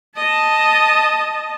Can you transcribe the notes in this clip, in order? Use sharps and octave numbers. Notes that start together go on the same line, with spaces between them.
D#5 A5